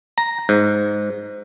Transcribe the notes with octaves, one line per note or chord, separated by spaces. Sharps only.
A#5
G#2